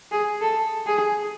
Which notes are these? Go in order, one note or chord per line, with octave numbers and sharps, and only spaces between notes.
G#4
A4
G#4